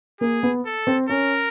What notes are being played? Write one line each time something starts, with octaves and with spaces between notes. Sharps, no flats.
A#3 G#4
B3
A4
C4
C#4 A#4